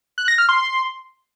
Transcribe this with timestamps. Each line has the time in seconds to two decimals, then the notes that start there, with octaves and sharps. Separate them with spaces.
0.18 F#6
0.28 A#6
0.38 F6
0.49 C6